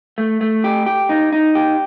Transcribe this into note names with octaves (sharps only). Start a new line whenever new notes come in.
A3
A3
G4
G4
D#4
D#4
G4